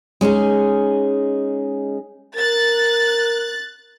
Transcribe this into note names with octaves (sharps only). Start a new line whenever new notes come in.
G#3 C#4 D#4 G#4
A#4 F#6 A6